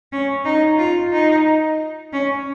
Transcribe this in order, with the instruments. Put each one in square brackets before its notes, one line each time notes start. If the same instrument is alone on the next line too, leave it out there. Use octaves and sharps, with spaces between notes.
[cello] C#4
D#4
F4
D#4
C#4